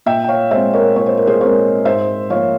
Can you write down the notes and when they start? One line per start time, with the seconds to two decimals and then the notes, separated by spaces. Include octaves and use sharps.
0.06 A#2 E5 G5
0.24 G5
0.28 C#5 F5
0.51 G#3 C4 C5 E5
0.73 A#4 C#5
0.96 A#2 C#5
1.06 C5
1.17 A#4
1.27 G#4 C5
1.41 G#3 C4 A#4 C#5
1.85 G#2 C5 E5
2.30 F3 A#3 C#5 F5